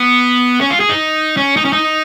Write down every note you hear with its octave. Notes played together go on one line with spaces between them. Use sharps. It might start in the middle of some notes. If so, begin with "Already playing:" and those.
Already playing: B3
C#4
F4
G#4
D#4
C#4
D#4
C#4
D#4